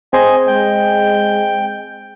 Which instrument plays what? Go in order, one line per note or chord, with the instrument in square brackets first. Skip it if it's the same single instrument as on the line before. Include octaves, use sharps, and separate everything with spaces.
[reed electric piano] C4 G#4 C5 [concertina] D#5 G#5
[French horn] G#3 [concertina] G5